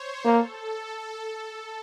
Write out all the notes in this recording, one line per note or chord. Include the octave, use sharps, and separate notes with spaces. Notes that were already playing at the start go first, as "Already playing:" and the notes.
Already playing: C5 C#5
A#3 A4